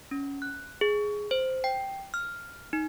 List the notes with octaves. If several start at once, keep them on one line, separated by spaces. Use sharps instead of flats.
C#4
F#6
G#4
C5
G5
F6
D#4